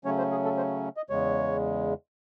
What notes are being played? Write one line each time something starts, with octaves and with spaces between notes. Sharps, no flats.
C#3 F#3 A3 C#4 C#5
C5
G#4
A4
C5
D#5
E2 C#3 G#3 C#5